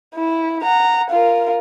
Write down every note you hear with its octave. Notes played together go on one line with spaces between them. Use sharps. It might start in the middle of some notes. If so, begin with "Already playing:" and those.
E4
F#5 A#5
F4 A#4